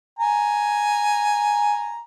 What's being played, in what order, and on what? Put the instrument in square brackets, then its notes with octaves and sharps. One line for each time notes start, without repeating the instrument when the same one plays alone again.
[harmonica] G#5 A#5